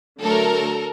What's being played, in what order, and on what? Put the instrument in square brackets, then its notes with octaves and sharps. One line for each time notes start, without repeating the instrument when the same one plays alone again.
[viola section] D3 F#3 A3 [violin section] A4 A#4